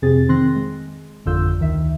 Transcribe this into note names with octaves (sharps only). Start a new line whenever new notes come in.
F2 C3 C4 G#4 A6
D#3 C4 C6 F#6 A#6
G#3
G#1 F2 D3 F4 E6 G6
D2 D#3 E5